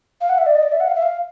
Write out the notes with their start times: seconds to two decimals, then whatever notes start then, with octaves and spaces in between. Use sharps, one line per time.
0.21 F5
0.29 F#5
0.38 E5
0.46 D5
0.55 D#5
0.63 D5
0.72 E5
0.80 F#5
0.88 F5
0.95 E5
1.02 F5